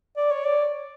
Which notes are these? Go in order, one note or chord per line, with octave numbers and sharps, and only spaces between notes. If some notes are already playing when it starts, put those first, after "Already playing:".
D5
C#5
D5